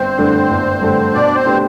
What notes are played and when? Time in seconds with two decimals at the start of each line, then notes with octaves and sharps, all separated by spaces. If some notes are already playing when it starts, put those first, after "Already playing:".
Already playing: G1 C4 C5
0.18 G2 D3 A3 D4
0.51 G1
0.82 G2 D3 A3 D4
1.14 B2 D4 D5
1.35 C4 C5
1.46 A3 D4 G4 B4